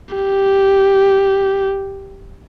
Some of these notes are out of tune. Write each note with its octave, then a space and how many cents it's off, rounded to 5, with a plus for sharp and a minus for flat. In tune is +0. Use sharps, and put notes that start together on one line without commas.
G4 -5